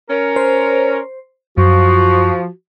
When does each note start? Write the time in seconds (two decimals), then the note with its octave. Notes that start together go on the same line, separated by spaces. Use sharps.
0.09 C#4 A#4
0.36 C5
1.58 F#2 F3 F#4